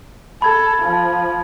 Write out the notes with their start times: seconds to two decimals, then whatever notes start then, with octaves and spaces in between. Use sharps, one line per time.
0.42 A4 B5 G#6
0.83 F3